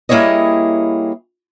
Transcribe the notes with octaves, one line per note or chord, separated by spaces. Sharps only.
G3 A#3 E4 G#4 C#5 D#5